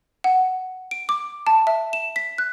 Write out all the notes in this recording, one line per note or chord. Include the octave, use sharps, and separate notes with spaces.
F#5
D7
D6
A5
E5
E7
B6
F#6